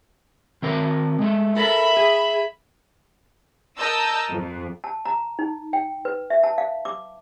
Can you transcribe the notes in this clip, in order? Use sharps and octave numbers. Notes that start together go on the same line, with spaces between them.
D#3 C4 A#4
G#3 A3
A4 A#4 E5 B5
G#4
A#4 D#5 A5 E6 G6
F2
A5
A#5
D#4
G5
B4
E5
A5
F5
D6